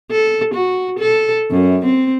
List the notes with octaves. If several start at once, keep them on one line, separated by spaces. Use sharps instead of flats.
A4
F#4
A4
F#2
C4